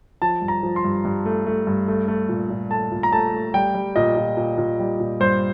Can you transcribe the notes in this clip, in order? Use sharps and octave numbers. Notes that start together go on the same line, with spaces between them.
F3 A5
G2
A#5
F3
C6
G2
G2
A3
A3
G2
A3
A3
A#2
A#2
A3 A5
A#2
A#5
A3 A5
A3
G3 G5
G3
A#2 D#5
A#2
A#2
A#2
G3
A#2
G2 C5